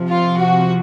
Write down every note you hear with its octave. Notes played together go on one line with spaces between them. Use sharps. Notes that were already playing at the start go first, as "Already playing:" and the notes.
Already playing: C3 F3
F4
F#4